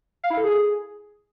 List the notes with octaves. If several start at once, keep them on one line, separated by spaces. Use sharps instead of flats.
F5
E4
A4
G#4